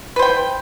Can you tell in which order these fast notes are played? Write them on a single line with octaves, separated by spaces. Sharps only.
B4 C5 G5